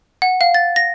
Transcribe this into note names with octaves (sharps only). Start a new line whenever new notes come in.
F#5
F5
A6
A#6